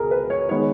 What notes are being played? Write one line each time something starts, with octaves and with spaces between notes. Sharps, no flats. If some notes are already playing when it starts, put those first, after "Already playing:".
Already playing: C#2 B2 G#4 A#4
B4
C#5
D#3 G#3 B3 C#5